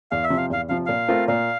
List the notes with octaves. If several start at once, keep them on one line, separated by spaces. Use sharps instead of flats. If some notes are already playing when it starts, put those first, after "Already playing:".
E2 F5
E5
C3 F3
F5
E2 F5
C3 F3 F5
A#2 F5
A3 C4 F4 A#4
A#2 F5